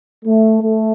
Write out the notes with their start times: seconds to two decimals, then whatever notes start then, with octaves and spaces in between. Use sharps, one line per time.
0.26 A3
0.63 A3